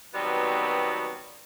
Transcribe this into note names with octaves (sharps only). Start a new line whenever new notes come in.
B2 D#3 F#3 G3 B3 C4